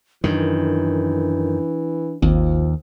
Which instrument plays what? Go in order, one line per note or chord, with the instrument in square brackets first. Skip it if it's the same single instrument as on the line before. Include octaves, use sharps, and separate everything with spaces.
[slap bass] F#2 D#3 [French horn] E3 [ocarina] D4
[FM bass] G#1 [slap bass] D#2 [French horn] F3